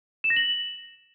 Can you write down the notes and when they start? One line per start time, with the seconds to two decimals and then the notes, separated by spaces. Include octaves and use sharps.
0.24 E7
0.30 A#6
0.36 F#7